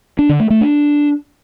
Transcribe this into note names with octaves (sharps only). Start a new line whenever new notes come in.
D4
D3
A3
A3
D4